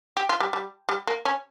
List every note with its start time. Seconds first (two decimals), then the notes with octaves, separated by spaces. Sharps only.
0.17 G4
0.29 F4
0.40 G3
0.53 G3
0.89 G3
1.07 A#3
1.25 C#4